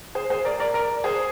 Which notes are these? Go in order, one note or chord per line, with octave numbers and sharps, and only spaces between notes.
G#4 C5
G#4 C5
A#4 D5
A#4 D5
A#4 D5
G#4 C5